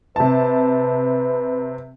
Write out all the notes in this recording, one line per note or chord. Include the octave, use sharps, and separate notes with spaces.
C3 B4 A5